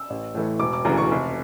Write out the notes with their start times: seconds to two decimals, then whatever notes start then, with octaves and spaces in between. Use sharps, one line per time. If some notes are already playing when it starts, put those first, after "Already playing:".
Already playing: E6
0.10 A1
0.35 A2 E3 A3
0.60 E1 D6
0.73 D6
0.85 D2 C#3 E3 A#5
0.97 C#6
1.11 F1